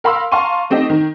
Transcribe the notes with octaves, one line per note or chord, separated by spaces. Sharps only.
A#4 F5 B5 C6 E6
F5 A5 A#5 C6 C#6 D#7
A3 C4 D#4 G4 D#5
D#3